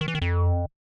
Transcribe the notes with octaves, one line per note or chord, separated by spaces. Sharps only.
D#3
E3
D#3
F2